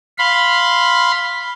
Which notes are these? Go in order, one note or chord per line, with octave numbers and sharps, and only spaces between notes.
F5 B5 C6